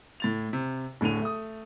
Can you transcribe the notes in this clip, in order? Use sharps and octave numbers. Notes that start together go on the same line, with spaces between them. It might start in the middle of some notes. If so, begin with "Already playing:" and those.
A2 A6 F7
C3
D1 A2 D3 D#7 F7
A3 D#6